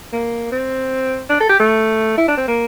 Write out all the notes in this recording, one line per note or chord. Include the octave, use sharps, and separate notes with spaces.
A#3
C4
D4
A4
G4
A3
E4
D4
C4
A#3